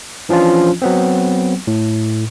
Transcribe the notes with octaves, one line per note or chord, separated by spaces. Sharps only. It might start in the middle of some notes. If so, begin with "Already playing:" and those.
E3 F3 C#4 D4 F4
F#3 B3 C4
A2